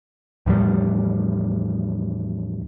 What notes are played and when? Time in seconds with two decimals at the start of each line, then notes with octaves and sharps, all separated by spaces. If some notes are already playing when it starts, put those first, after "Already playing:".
0.46 E2 A2 F3 G3